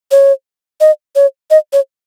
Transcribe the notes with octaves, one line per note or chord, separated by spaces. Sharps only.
C#5
D#5
C#5
D#5
C#5